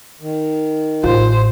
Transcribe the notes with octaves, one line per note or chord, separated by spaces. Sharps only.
D#3
A1 F4 C5